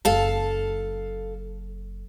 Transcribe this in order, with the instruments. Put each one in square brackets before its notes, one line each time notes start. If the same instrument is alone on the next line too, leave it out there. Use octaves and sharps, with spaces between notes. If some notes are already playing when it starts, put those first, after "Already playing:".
[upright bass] F#1 F#3 [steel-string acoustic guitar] A4 F5 A5